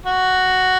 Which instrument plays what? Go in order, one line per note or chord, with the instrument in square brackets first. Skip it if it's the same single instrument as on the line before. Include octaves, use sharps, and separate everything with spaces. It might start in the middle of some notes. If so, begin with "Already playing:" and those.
[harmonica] F#4